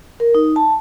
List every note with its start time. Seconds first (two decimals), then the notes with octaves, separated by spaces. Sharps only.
0.20 A#4
0.35 D#4
0.56 A5